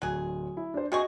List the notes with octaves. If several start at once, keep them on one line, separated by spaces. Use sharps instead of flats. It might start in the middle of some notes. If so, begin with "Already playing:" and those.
D1 F#3 G#4
E4
D4 C5
C3 F#4 G#4 D#5 C#6